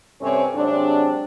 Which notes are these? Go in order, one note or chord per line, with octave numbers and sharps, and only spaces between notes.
G2 C3 C4 C#4 A4 C#5
C3 F#3 G#3 C4 D4